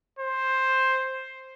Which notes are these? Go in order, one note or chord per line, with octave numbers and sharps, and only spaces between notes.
C5